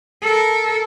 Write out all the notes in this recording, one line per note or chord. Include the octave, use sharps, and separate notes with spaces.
A4 A#4